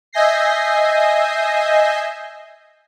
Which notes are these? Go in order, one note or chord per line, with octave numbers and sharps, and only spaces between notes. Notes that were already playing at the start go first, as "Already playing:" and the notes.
D#5 E5 G#5 G6 A#6 C7